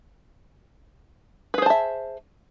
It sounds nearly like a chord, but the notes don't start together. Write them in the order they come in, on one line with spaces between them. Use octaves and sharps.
B4 G#4 C5 A5 E5